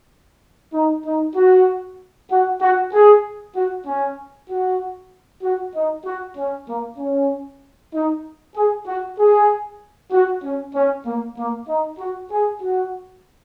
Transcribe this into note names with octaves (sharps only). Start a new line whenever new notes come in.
D#4
D#4
F#4
F#4
F#4
G#4
F#4
C#4
F#4
F#4
D#4
F#4
C#4
A#3
C#4
D#4
G#4
F#4
G#4
F#4
C#4
C#4
A#3
A#3
D#4
F#4
G#4
F#4